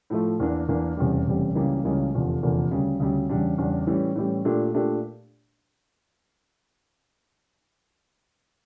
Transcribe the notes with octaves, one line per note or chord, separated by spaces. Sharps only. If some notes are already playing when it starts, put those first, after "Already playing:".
A2 F3 A3
E2 E3 A#3 D4
E2 E3 A#3 D4
F1 E2 C#3 G3
F1 E2 C#3 G3
C#2 C#3 E3 G3 A#3
C#2 C#3 E3 G3 A#3
F1 E2 D3 F3 A#3
F1 E2 D3 F3 A#3
D2 C#3 G3
D2 C#3 G3
E2 C#3 G3 D4
E2 C#3 G3 D4
A2 E3 G3 C#4 G4
A2 E3 G3 C#4 G4
A#2 A3 D4 G4
A#2 A3 D4 G4